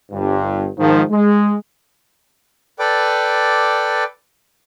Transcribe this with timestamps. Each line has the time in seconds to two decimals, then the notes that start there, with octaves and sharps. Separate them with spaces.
0.12 G1 G2
0.78 G#2 D#3 F3
1.10 G#3
2.79 A4 B4 D5 G5 D6